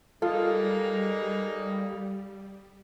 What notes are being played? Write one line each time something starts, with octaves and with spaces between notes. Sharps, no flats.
G3 G#3 A#3 D#4 F4 A4